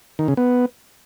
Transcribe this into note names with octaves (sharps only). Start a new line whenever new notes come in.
D#3
C#3
B3